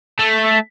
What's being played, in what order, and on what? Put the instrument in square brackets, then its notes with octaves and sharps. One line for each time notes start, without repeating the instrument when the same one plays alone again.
[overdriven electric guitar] A3